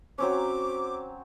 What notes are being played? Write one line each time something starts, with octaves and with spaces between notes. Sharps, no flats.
F#3 C4 C#4 D6